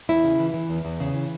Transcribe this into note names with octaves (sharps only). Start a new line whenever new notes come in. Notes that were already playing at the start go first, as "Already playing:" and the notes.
E2 E4
C#3
E3
E3
E2
E2
C#3
E3